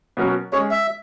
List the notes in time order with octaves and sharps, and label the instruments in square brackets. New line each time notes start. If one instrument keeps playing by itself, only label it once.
[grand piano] B2 F#3 C#4 F#4 A#4
[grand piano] G#3 C#4 G#4 [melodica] C#5
[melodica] E5